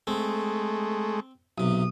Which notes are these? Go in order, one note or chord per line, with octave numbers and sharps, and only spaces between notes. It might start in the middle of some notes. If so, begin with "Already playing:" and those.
G#3 A3 C4
B1 C3 D#6